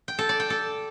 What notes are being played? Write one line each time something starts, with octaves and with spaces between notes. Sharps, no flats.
G5
A4
D5
G5
A4